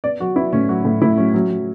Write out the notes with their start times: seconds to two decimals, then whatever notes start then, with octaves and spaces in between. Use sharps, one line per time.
0.04 B3 D5
0.20 F#3 F#4
0.36 B3 E4
0.53 A2 C#4
0.69 F#3 F#4
0.85 A2
1.02 A2 E4
1.17 F#3 C#4
1.34 F#3 C#4
1.51 F#3